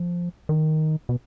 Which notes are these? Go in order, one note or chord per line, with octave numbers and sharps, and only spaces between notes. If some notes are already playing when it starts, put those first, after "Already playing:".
Already playing: F3
D#3
B2